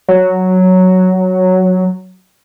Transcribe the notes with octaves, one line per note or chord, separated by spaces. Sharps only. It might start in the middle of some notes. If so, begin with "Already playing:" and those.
F#3